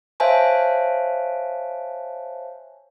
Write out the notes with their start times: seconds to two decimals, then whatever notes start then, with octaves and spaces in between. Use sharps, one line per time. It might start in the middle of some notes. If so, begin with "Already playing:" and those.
0.20 C5 C#5 E5 F5 G#5 A5